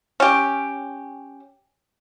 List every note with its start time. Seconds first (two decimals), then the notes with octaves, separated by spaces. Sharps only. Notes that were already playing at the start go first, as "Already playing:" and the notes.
0.20 C#4 G4